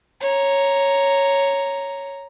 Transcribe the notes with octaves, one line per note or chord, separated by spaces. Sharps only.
C#5 A#5